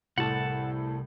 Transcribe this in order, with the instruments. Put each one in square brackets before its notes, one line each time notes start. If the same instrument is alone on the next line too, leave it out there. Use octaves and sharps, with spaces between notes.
[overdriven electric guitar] C2 [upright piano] A2 A4 [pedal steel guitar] F#5 A5